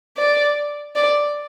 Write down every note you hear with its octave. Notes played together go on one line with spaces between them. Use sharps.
D5
D5